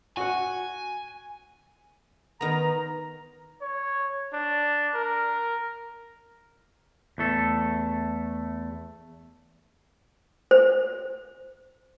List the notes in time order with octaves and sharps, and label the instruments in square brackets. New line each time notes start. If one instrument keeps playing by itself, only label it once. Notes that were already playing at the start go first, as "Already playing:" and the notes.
[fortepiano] F#4 F#5 [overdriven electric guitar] G#5
[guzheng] D#3 B3 [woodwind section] A#5
[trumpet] C#5
D4
A#4
[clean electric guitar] E2 A3 A4
[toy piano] C5